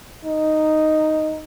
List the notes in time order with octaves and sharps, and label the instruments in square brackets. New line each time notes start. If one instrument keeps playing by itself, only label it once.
[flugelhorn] D#4